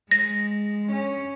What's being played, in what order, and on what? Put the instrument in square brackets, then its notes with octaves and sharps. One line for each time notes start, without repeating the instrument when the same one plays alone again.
[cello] G#3 [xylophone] A#6
[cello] C#4